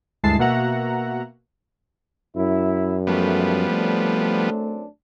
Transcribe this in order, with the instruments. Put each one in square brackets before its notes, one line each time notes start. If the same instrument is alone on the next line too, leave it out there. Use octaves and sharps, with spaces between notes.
[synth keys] D2 G2 G#3 E4 A5 C7
B2 A#3 F#4 E5 F#5 A#5
[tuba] F#2 [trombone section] E4
[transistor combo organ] F3 G3 B3 [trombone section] A3
[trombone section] F#2 C4 D4 [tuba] A3